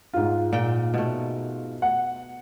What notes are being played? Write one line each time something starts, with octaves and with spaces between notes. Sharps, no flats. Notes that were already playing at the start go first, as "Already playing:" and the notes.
G#2 F4
A#2 G5
B2 A3
F#5